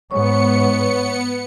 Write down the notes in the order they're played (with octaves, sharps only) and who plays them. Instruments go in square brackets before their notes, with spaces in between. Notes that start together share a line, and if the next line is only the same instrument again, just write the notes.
[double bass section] G#2 [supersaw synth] B3 C#7 [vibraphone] C#5 C#6